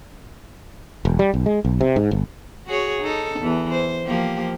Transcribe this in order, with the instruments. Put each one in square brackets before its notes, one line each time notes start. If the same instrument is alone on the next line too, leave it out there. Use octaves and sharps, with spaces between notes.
[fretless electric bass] E1
G3
B1
G#3
B1
C3
G#2
G1
[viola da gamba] F#4 G#4 C#5
D#4 A4
E2 E3
C5
F3 A#3 G4